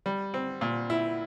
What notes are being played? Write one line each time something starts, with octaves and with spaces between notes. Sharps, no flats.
G3
C4
A#2
E4